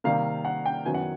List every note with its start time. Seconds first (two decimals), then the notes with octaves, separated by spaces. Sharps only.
0.04 C3 D#3 G3 A#3 F5
0.45 F#5
0.66 G5
0.85 F#2 D#3 F#3 B3 E4 G#5
0.94 F#5